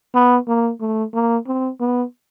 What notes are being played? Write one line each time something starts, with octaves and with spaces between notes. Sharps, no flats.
B3
A#3
A3
A#3
C4
B3